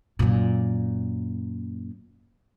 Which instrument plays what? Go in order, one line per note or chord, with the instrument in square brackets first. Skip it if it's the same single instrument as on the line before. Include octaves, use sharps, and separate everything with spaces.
[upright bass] F#2 A#2